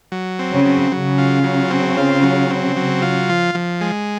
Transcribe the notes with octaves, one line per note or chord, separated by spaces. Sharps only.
F#3
C4
C#3
F#3
C#3 F#3
F4
F#3
C4
F4
F#3
C4
F#3
F4
F3
F3
G#3